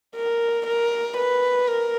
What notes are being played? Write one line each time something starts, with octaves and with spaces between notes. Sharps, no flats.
A#4
A#4
B4
A#4